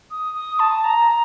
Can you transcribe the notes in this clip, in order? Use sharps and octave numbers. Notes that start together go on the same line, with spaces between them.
D#6
D#6
A5
A#5